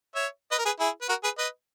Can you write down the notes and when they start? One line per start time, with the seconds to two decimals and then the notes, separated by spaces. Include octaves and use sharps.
0.15 C#5 E5
0.51 B4 D#5
0.59 A#4
0.66 G#4 B4
0.80 E4 G#4
1.01 B4
1.09 F#4 A#4
1.24 G#4 B4
1.38 B4 D#5